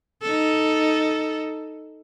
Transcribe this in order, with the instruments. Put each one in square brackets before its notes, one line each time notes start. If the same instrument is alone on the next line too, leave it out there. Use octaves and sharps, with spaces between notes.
[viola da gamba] D#4 A4